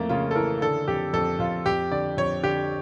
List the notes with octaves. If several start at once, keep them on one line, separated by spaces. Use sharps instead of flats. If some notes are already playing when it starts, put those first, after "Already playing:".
Already playing: F2 E3 A3 A#3
C#3 F4
A4
E3 A#4
D3 A4
F2 G4
F2 A4
F2 F4
F2 G4
D3 D5
F2 C#5
D3 G4